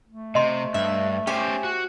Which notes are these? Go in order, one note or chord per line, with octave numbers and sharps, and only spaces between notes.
A3
C3 D#5 C6
G2 E5
C#4 G4 C5 G#5
F#4